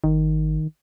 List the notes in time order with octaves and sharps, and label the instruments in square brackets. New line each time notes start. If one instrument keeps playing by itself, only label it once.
[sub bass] G#1 [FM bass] D#3